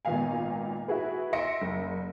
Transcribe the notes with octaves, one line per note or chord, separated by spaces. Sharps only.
G#1 A#2 D#3 B3 F5 G#5
E4 F#4 G#4 B4
E5 C6 A#6 C#7 D7
F#1